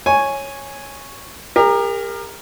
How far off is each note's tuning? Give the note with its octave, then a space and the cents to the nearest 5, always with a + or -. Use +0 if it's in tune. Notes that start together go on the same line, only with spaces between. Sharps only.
C#5 -5 G#5 +0
G4 +45 A#4 +0